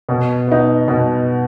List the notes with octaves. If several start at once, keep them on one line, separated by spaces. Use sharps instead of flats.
B2
B3 D#4
B2